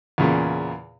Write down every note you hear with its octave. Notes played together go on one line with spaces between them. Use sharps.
E2 A#2 C#3